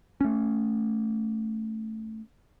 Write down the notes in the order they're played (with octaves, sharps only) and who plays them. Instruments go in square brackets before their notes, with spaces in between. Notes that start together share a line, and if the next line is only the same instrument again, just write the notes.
[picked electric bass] A3 C#4